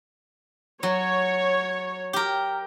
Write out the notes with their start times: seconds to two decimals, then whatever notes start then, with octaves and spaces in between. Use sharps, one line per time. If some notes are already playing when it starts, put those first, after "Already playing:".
0.83 F#3 C#5
2.13 G4 A#4